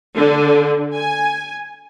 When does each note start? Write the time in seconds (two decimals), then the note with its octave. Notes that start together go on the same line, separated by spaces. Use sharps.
0.15 D3
0.94 G#5